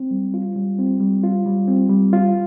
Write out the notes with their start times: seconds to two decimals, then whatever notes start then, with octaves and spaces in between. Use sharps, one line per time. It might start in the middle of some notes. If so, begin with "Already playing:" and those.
Already playing: C4
0.11 G3
0.34 F4
0.56 G3
0.79 C4
1.00 G3
1.24 F4
1.46 G3
1.68 C4
1.89 G3
2.13 F4